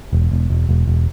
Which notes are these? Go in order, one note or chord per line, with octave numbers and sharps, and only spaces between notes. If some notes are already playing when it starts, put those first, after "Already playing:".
E1
E1
E1
E1
E1